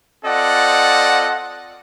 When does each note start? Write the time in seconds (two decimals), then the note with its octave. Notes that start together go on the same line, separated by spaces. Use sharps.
0.25 C4 F4 A4 D5 D#5 F#5